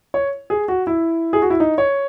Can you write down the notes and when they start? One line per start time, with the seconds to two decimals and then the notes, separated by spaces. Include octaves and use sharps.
0.14 C#5
0.50 G#4
0.68 F#4
0.87 E4
1.33 G#4
1.42 F#4
1.50 E4
1.60 D#4
1.78 C#5